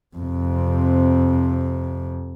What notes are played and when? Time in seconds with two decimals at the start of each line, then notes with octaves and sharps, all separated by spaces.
0.16 F2 C3